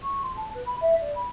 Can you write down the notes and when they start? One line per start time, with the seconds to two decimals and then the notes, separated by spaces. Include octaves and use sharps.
0.03 C#6
0.23 C6
0.36 A5
0.54 B4
0.66 B5
0.81 E5
1.01 D5
1.15 B5